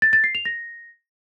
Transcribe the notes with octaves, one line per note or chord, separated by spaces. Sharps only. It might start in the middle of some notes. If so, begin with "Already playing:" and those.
A6
A6
C7
F7
A#6